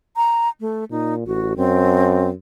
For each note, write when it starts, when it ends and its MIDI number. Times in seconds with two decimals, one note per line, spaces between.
0.16 0.49 82
0.60 0.84 57
0.91 1.23 46
0.91 1.14 63
1.26 1.54 33
1.26 1.53 66
1.57 2.32 42
1.57 2.30 60